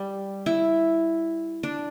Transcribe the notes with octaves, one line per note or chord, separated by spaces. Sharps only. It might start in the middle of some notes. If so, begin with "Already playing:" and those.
Already playing: G3
E4
D4